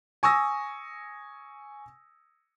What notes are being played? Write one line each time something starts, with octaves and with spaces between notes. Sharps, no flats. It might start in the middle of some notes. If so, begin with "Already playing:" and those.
G#5 C#6 D#6 E6 A#6